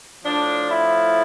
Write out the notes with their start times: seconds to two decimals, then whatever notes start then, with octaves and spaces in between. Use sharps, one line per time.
0.25 A2 F3 D4
0.70 E4